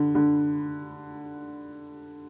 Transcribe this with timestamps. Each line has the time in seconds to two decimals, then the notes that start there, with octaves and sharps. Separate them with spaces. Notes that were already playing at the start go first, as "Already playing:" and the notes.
Already playing: D3
0.15 D3